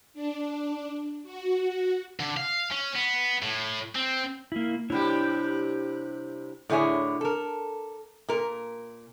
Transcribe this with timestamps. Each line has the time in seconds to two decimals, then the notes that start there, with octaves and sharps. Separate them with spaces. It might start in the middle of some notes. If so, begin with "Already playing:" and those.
0.14 D4
1.23 F#4
2.20 D3
2.37 F5
2.71 C#4
2.95 B3
3.42 A2
3.96 C4
4.52 A#3 E4
4.90 C3 G3 D4 E4 G4 C#5
6.69 A2 D3 E4 G#4 C#5 D5
7.21 A4 A#4
8.28 A#2 A#4